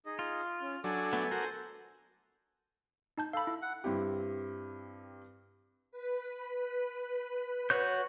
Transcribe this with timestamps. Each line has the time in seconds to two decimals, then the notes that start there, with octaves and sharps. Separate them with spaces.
0.06 D#4 G#4 D#5
0.19 F4
0.61 C#4
0.84 F#3 D4 A4 G#5
1.13 A3 B3
1.31 F#4 A#4 C5
3.18 D#4 A5 G6
3.33 A4 F5 B5
3.47 E4
3.62 F#5
3.84 G2 C4 E4 G4
5.91 B4
7.70 F#4 C#5 G6